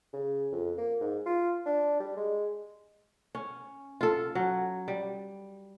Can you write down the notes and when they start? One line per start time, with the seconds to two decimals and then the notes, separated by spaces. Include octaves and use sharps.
0.13 C#3
0.52 F2
0.78 A#3
1.01 G#2
1.26 F4
1.66 D4
2.00 G3
2.16 G#3
3.35 C#4
4.01 F4 A4
4.35 F#3
4.88 G3